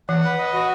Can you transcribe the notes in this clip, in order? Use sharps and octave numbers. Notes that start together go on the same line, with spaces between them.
E3 F#5
B4
D#5
F#4